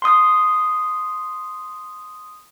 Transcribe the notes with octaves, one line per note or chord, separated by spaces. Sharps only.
C6 D#6